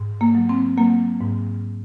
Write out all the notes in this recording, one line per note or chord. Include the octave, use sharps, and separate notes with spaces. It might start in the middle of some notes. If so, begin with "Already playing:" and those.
Already playing: G#2
A#3
F#3
C4
F#3 A#3
G#2